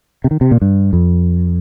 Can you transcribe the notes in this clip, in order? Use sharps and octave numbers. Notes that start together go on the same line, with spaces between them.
C3
D#3
C3
A#2
G2
F2